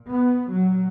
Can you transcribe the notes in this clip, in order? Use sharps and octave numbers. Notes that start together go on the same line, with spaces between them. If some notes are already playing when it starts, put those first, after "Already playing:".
Already playing: A#2
B3
A#2 F#3